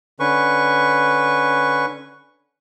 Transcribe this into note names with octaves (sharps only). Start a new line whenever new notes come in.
D3 C#4 B4 C#6